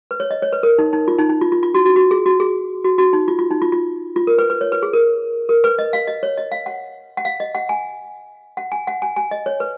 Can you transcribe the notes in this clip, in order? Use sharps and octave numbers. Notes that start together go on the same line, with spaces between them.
B4
C#5
D#5
C#5
B4
A#4
D#4
D#4
F4
D#4
D#4
F4
F4
F4
F#4
F#4
F#4
G#4
F#4
G#4
F#4
F#4
D#4
F4
F4
D#4
F4
F4
F4
A#4
B4
B4
C#5
B4
G#4
A#4
A#4
B4
D#5
F5
D#5
C#5
D#5
F5
F#5
F#5
F5
D#5
F#5
G#5
F#5
G#5
F#5
G#5
G#5
D#5
C#5
B4